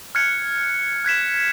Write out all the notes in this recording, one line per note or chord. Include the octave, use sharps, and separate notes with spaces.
F6 F#6 G#6 C#7
F#6 G#6 B6 E7